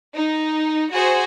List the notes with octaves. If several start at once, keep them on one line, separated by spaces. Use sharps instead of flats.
D#4
F#4 G#4 C5